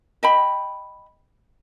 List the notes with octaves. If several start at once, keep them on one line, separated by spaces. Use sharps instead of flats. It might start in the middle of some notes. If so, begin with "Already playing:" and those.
D#5 G5 B5